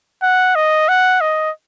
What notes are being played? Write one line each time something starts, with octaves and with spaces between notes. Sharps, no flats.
F#5
D#5
F#5
D#5